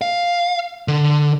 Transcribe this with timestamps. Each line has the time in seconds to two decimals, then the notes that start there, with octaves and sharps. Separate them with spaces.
0.01 F5
0.88 D3